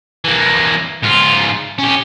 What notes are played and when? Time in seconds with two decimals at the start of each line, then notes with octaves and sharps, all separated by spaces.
0.25 E3 A#3
1.03 G#2 F4
1.79 C#4 G4